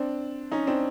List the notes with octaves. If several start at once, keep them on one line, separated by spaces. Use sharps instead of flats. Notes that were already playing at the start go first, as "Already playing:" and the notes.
Already playing: C4 D4
C#4 D#4
C4 D4